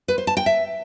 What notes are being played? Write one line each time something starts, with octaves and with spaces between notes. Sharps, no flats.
B4
C5
A5
G5
E5